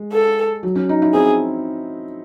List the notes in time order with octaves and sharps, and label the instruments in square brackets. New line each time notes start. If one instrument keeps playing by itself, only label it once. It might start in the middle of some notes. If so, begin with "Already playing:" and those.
Already playing: [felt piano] G#3
[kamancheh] A4
[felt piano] F#3
C#4
D#4
E4
[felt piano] C4 [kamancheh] G#4